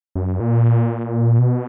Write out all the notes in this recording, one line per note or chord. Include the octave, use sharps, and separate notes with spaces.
F#2
A#2
B2